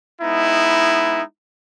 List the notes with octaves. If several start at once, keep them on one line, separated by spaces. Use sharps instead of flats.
G#3 B3 D#4 E4